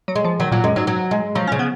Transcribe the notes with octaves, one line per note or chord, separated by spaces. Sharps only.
F#3
G#3
F3
D#3 F#3
A#2 F#3
F#2 G#3
G#2 F#3
F#3
G#3
F3 F#3
C#4
C#3
B3